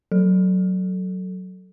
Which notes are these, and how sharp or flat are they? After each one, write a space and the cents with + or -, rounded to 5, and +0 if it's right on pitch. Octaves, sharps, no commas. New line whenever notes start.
F#3 +5 A4 +0